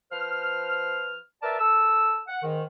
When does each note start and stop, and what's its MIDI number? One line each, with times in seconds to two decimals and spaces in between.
0.12 1.16 53
0.12 1.16 71
0.12 1.16 72
0.12 1.16 89
1.43 1.59 70
1.43 1.59 71
1.43 1.59 74
1.43 1.59 76
1.43 1.59 81
1.59 2.19 69
1.59 2.19 88
2.28 2.40 78
2.43 2.62 44
2.43 2.62 51